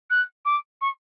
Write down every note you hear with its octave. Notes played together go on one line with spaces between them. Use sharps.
F#6
D6
C#6